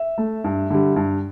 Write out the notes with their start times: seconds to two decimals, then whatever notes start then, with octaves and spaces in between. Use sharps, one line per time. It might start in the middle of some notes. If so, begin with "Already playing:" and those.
Already playing: E5
0.18 A3
0.44 G2
0.70 D3 G3
0.96 G2